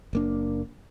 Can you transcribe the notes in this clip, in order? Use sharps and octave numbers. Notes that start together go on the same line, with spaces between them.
F#1 A#3 D4